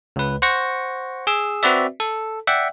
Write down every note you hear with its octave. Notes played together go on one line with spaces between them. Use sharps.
C#2 B4
C5 F#5 C#6 A#6
G#4 E6
C4 F#4 B4 D5 E5
A4
D5 E5 F#5 G5